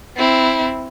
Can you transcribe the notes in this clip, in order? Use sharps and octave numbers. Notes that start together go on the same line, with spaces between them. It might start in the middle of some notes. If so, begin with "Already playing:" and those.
C4 E4